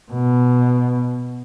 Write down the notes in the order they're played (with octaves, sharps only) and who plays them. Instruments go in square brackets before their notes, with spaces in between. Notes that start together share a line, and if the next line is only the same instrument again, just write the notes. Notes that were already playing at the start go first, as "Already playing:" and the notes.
[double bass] B2